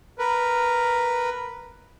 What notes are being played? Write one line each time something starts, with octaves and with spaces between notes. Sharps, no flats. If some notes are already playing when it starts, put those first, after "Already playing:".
A#4 B4